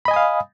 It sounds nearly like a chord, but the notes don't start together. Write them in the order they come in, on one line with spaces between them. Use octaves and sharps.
B5 D#5 G#5 D#6 F5